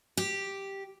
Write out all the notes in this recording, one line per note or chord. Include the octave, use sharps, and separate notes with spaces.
G4